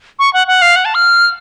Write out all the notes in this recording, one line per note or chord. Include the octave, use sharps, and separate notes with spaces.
C#6
F#5
F#5
F5
F#5
A5
F6